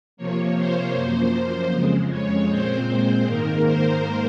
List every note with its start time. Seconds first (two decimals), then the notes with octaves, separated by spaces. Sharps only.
0.17 C3 F3 A#3 C#5
0.56 C5
0.94 F#2 F3 A#3
1.72 F2 C#3 G#3
2.10 C#5
2.48 A#2 G#3 C4 C5
3.26 G#2 D#3 A#3 A#4
3.64 C5